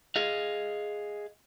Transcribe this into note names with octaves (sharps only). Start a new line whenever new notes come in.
G#4 D#5 F5